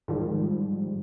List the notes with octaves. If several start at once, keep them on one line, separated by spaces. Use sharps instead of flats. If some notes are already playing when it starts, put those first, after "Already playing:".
G#2 D#3 F3 G3